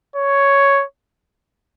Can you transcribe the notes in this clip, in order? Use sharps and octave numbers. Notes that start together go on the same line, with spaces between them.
C#5